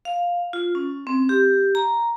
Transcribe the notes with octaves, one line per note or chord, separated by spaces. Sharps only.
F5
F4
C#4
C4
G4
A#5